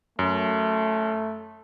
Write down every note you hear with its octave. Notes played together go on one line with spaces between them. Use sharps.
F#2 A3